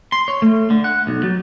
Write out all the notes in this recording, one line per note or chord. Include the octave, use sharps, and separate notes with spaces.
C6
C#5
A3
D3
F#5
B1
F#3